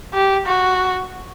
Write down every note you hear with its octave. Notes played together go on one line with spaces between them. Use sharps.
G4
F#4